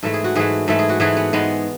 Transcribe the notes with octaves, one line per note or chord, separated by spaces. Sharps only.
G#2 E3 A3 A4
G#4
F#4
G#2 E3 A3 G#4
G#2 E3 A3 A4
G#4
F#4
G#2 E3 A3 G#4
B3
G#2 G#3 B3